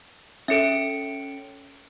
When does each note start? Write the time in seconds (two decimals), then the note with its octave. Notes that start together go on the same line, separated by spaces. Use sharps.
0.48 C#4 A4 E5 C#7 D7